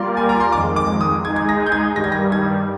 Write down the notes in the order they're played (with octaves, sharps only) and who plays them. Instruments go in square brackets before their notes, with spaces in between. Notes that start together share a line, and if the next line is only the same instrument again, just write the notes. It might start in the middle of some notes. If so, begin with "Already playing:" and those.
Already playing: [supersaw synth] G3 A#3 F4 A#4 D5 [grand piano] C6
[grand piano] G#5
A#5
C6
[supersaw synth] F2 D#3 G#3 [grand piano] D6
[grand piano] D6
D#6
[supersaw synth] G#3 D#4 G#4 [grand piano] G#6
[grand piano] G#6
A#6
G6
G#6
[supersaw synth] G2 D#3 G3 [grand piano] A#6
[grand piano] G#6
A#6
G#6